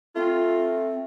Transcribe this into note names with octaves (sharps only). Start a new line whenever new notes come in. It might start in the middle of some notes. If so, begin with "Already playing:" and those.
A3 C4 F4